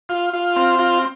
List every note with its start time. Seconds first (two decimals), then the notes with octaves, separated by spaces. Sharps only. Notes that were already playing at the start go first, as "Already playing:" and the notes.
0.09 F4
0.33 F4
0.56 C4
0.79 F4